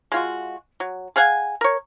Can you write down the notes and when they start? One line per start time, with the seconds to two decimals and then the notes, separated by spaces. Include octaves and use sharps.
0.12 G#3 F4 F#4
0.80 F#3
1.16 G#4 F5 F#5 G#5
1.61 A#4 C#5